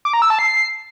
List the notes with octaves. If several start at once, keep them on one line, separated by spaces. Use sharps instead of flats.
D6
A#5
E6
A5
C7